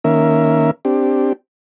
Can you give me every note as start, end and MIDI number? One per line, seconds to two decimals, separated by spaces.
0.04 0.71 51
0.04 0.71 58
0.04 0.71 61
0.04 0.71 70
0.04 0.71 76
0.85 1.33 60
0.85 1.33 62
0.85 1.33 67